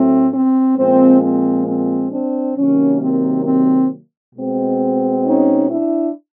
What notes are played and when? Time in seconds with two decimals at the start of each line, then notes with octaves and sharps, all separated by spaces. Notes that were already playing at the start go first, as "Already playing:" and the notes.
Already playing: A2 F#3 A3 C4
0.32 C4
0.77 A#2 F3 G#3 C4
1.22 C4
1.66 C4
2.11 C4 D4
2.56 C3 D#3 F#3 A#3 C#4
3.01 C4
3.45 C4
4.35 B2 G#3 C4
5.25 C#4 D#4
5.69 D4 E4